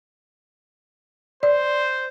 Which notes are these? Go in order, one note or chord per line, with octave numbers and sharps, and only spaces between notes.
C5 D5